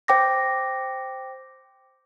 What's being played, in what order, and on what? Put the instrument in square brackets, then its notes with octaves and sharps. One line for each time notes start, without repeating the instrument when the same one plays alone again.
[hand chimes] C5 G5 D6 A#6